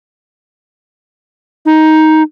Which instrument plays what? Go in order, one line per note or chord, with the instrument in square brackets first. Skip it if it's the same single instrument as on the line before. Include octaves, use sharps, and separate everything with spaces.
[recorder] D#4